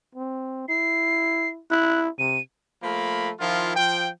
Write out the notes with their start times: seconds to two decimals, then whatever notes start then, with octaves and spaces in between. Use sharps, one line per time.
0.15 C4
0.69 E4 C7
1.71 E4 F#6
2.19 C3 D#7
2.82 F3 A3 A#3 B5
3.40 D#3 F3 E4 F4
3.76 F3 G5